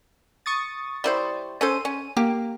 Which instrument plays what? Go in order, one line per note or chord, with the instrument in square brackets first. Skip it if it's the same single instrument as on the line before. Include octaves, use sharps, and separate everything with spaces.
[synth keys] C#6 D#6 A6
[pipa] G3 E4 C5
[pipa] C#4 A4 C5 [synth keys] D#7
[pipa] C#4
[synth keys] A#3 [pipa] G4